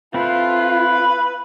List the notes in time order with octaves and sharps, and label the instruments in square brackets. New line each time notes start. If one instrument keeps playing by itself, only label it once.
[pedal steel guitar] C4 E4 A4 [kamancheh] F4 [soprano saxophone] B4